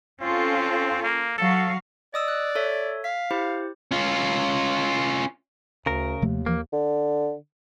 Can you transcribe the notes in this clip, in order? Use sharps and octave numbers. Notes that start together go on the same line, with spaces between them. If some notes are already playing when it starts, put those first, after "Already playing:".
C4 C#4 F4 A4
A#3
F#3 F#4 A4 F5
D5 D#5 D#6 E6
F#6
A4 C#5 E5
F5 B6
E4 G4 C5
C#4 F4
D2 C#3 A#4
D#2 C3 F3 A3
E3 F3 A#3
D3